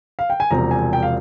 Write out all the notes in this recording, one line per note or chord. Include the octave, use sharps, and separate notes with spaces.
F5
G5
G#5
E1 E2 C3 F3 C4 A#5
G#5
G5
F5